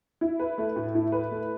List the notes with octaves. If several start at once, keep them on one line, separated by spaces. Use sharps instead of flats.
E4
B4
A3
A2
E4
B4
A3